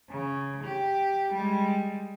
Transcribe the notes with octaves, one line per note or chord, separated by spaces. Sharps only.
C#3
G4
G3 G#3